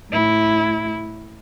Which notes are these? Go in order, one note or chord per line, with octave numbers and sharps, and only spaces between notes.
A2 E4